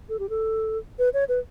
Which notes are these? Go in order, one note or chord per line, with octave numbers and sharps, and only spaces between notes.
A4
G4
A4
B4
C#5
B4